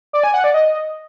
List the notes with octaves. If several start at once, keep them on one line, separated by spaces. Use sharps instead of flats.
D5
G#5
F#5
D5
D#5